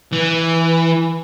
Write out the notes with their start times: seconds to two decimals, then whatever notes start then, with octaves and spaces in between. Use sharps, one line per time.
0.12 E3